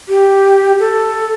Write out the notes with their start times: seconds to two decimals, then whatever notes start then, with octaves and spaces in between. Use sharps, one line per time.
0.09 G4
0.80 A4